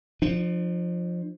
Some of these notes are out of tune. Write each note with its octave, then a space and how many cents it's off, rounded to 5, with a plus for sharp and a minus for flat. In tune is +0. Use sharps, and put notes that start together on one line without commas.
F3 +10 D4 +45